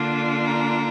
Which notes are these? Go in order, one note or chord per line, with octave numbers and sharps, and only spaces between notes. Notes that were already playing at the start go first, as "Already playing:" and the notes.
Already playing: D3 A#3 D4 F4
A#5